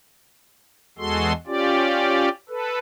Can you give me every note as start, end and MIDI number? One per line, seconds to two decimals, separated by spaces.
0.99 1.33 40
0.99 1.33 56
0.99 1.33 66
0.99 1.33 68
0.99 1.33 69
0.99 1.33 84
1.47 2.29 61
1.47 2.29 65
1.47 2.29 67
1.47 2.29 74
2.49 2.79 69
2.49 2.79 71